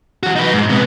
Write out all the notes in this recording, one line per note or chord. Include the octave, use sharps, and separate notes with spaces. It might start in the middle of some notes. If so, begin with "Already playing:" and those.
E3 F#4
D#4 B4
G#2
C3 B3